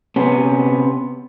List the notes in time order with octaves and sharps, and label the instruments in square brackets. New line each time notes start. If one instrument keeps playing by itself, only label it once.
[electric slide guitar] C3 B3 C#4